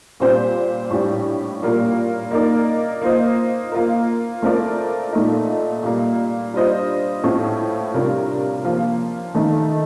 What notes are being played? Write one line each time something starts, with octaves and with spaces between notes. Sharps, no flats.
A#2 G3 C4 G4 C5
A2 G3 D4 G4
A#2 G3 A#3 F4 A#4
A#3 D#4 A#4 D5
A#3 F4 C5 D#5
A#3 F4 A#4
A3 C4 F4 A#4 D5
A#2 A3 D#4
A#2 G3 A#3
G3 D4 F4 C5 D#5
A2 A3 C4 F4
C3 G3 D4 F4 A#4
F3 A#3 F4
D#3 A3 D#4